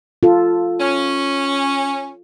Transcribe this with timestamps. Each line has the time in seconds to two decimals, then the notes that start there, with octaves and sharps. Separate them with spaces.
0.23 F4 A4
0.80 C#4